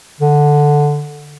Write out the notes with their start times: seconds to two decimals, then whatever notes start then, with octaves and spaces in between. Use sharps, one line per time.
0.20 D3